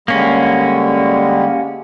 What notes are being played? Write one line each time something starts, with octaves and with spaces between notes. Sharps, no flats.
D3 G3 G#3 A#3 C#4